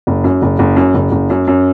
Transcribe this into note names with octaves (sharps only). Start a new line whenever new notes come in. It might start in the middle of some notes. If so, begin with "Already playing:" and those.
F#1
F#2
F#1
F#1
F#2
F#1
F#1
F#2
F#2